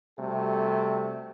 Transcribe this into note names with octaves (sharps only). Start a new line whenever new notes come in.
C3 G3 A3 F#4 A4